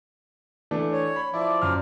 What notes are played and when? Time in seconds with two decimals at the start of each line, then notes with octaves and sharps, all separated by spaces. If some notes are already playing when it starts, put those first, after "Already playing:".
0.71 E3 A3 D4
0.93 C#5
1.16 B5
1.34 F3 E4 D5
1.62 F#2 F6